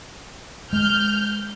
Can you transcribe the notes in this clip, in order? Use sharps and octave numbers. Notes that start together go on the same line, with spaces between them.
G#3 F6 G6